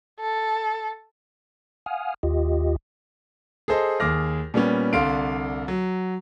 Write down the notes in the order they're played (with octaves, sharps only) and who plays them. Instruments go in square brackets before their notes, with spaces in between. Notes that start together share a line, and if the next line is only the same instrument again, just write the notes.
[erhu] A4
[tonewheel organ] F5 F#5 G#5 D#6 F6
D#2 F4 G4 D#5
[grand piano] G#4 A4 C5 D#5
D#2 G#4 D6 F6 A#6
A#2 G3 B3 C#4
C2 D3 F5 C6 D7
F#3